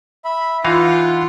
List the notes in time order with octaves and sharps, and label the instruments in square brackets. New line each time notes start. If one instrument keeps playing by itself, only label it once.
[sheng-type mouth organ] E5 B5
[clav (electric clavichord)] E3 D#4 F5 [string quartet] F4 [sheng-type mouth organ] F#5 C6